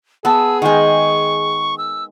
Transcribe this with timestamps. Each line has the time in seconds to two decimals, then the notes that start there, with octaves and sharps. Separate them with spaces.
0.25 B3 F#4 G#4 A5 E6
0.62 D#3 G#3 F#5 G5 C#6
1.78 E6